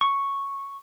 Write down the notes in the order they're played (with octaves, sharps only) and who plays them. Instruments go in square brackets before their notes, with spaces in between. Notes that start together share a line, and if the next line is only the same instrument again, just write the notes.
[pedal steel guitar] C#6